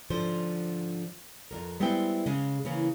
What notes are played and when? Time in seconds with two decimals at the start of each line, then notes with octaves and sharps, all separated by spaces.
0.10 G#2 D3 F3 C5
1.51 F2 G#2 A#4
1.80 G3 G#3 B3 C4 E4 G5
2.26 C#3 G#3
2.65 C#3 E3 A#3 C#4